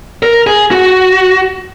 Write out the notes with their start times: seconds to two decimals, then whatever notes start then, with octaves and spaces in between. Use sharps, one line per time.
0.23 A#4
0.47 G#4
0.71 F#4